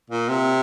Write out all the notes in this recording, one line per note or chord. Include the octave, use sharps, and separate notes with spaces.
A#2
C3